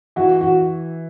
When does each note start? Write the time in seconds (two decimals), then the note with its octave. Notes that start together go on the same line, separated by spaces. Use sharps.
0.16 E3 F#4
0.41 F#4